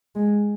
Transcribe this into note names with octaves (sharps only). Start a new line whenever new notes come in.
G#3